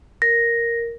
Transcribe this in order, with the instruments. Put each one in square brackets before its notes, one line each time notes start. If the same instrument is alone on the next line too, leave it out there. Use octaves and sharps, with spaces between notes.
[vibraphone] A#4 [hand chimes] A#6